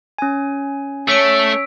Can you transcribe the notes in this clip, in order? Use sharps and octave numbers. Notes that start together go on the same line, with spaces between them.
C#4 G#5
A3 C#5 E6 B6 D7